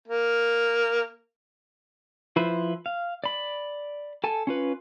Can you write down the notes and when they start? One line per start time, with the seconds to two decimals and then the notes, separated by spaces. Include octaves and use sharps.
0.08 A#3
2.36 F3 E4 B4 C5
2.86 F5
3.24 D5 B5
4.24 A4 G#5 A5
4.47 C#4 F4 B4